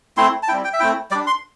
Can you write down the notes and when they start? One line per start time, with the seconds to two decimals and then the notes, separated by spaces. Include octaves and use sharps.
0.17 A3 C4 E4 C6
0.43 A5
0.48 G3 C4 E4 G5
0.64 G5
0.73 E5
0.80 A3 C4 E4 G5
1.11 G3 D5
1.15 D4
1.27 C6